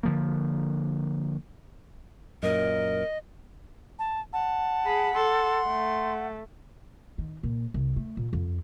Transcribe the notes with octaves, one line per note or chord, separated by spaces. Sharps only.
D3 F3 A#3
F#2 A#2 A#4 D#5
A5
F#5 A5
G#4 B5
A4 C6
A3
D#3
A#2
C2
A3
A#2
F2